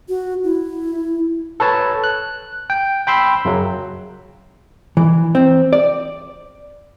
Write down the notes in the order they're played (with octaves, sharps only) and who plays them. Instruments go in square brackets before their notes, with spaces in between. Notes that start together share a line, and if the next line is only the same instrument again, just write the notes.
[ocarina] F#4
E4
[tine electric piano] A4 B4 C#5 A5
F#6
G5
G5 B5 C6 E6
F#2 C#3 F#3
[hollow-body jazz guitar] E3
C4
D5